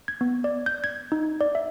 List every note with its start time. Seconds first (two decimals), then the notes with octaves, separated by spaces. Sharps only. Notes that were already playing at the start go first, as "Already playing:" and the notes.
0.08 G#6
0.21 B3
0.44 D5
0.66 G6
0.84 G#6
1.12 D#4
1.41 D5
1.55 E5